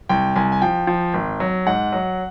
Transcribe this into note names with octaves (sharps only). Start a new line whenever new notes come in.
C2 G5
C2 G#5
G#5
F3 G5
F3
G#1
F#3
G#2 F#5
F#3